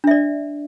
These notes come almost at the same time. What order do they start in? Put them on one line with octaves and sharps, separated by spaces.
D4 E5 D5